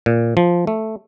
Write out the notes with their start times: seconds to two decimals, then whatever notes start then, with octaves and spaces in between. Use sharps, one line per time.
0.06 A#2
0.37 F3
0.67 A3